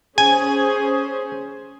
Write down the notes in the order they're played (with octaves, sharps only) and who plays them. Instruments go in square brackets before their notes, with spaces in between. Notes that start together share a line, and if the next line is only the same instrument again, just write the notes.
[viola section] C#4 G#4 C5 [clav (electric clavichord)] G#5